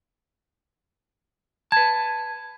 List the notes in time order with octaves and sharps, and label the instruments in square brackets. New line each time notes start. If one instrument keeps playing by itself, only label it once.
[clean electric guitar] B4 A5 [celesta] G#6